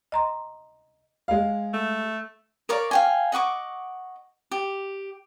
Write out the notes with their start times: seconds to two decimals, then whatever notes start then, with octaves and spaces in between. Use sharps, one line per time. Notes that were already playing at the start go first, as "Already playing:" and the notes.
0.12 D#5 A#5 C6
1.28 G#3 F5
1.73 A3
2.69 A#4 C#5 D5 F5
2.91 F5 G5 G#5
3.32 D#5 F#5 C#6 D6
4.51 G4